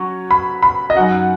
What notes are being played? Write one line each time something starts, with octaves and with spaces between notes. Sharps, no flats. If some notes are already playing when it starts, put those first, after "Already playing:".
Already playing: F#3 C#4 F#4 C#6
B5
B5
D#5
F#2 F#3 D#4 F#4 F#5